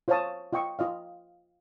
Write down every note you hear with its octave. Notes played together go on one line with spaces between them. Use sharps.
F4 C5 C#5 F5 A5 D#6
F4 D#5 G5 C#6 E6
F4 D#5 F5